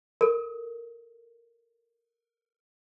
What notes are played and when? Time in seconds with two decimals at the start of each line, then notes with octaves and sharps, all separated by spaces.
0.21 A4 A#4